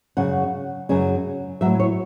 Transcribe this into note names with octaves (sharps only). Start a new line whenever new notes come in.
F#2 C#3 F#3 F#5
F#2 C#3 F#3
A2 F#3 E5
C#5